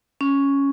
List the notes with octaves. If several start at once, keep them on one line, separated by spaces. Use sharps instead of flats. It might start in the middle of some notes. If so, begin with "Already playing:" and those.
C#4